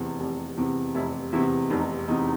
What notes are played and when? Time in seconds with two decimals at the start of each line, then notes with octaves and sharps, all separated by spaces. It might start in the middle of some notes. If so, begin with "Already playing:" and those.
Already playing: F1 E2 C3
0.20 F1
0.57 E2 C3
0.95 F1 E4
1.33 E2 C3 E4
1.70 F1 D#4
2.08 E2 C3 D#4